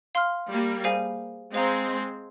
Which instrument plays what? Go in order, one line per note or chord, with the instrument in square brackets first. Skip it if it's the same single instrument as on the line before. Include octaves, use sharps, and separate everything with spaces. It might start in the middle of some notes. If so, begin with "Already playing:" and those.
[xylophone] F5 C6 F6
[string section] G3 A#3
[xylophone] G#4 C5 F5 G#5
[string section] G#3 C4 [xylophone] C5 F5 A#5